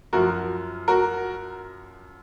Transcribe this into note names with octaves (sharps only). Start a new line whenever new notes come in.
F#2 F3 F#4 A#4
F#4 A#4